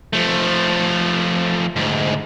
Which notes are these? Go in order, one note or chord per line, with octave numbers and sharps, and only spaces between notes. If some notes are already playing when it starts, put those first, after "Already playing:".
F3 A3
D2 G#2